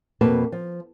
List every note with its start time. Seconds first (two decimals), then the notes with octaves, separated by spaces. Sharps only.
0.21 F2 B2 A#3 B4 A5
0.52 F3